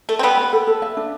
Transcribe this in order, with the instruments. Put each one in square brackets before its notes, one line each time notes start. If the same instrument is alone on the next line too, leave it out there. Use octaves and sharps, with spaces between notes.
[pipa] A3 [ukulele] A4
[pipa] C4
[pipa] G3 B3 [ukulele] G5
[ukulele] B5
A4
A4
E5
D4